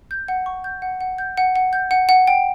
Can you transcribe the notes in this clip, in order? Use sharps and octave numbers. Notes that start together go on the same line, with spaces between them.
G6
F#5
C#6
G6
F#5
F#5
G6
F#5
F#5
G6
F#5
F#5
G5